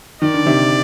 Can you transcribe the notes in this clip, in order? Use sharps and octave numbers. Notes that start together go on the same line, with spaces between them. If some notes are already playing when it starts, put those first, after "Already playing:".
D#3 D5
D3
C3 D#3